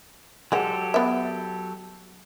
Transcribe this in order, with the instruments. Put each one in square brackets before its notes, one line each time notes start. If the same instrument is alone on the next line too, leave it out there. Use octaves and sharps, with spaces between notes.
[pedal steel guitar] F#3 G4 A4 [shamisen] G#3 F#4
[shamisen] B3 E5